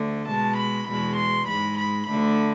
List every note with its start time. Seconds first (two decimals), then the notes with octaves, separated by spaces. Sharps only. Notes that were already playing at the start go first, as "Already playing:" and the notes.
Already playing: D2 D3 A3
0.28 B2 G#3 A5
0.58 B5
0.88 E2 B2 G#3 B5
1.18 C6
1.48 G#2 G#3 B5
1.78 B5
2.07 D2 D3 A3 B5